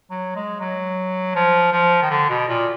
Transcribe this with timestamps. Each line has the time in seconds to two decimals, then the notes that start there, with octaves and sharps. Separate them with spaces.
0.10 F#3
0.36 G#3
0.60 F#3
1.35 F3
1.73 F3
2.02 D#3
2.10 D3
2.29 B2
2.48 A#2